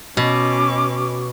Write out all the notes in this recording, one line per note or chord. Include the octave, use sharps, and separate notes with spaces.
B2 C#4 D6